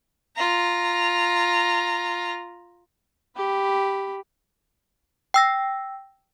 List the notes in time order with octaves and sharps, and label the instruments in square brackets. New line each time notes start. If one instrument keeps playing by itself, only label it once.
[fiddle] F4 A#5
[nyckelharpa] G4 B5
[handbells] G5 E6 A#6